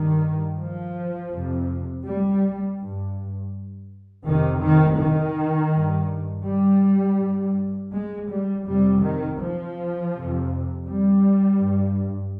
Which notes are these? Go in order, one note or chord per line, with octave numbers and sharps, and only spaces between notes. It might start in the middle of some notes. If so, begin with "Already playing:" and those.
Already playing: G2 D#3
F3
F2 C3
G3
G2
F2 C3 D#3
D#3
D#3
G2
G3
G2
G#3
G3
F2 C3 G3
D#3
F3
F2 C3
G3
G2